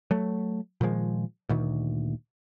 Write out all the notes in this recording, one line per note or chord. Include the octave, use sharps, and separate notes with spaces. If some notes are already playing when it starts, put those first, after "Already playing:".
F#3 A3
A#2 D#3 F3 G#3
D2 A#2 D#3